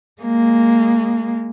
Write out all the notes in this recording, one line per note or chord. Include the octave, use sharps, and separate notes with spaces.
G#3 A#3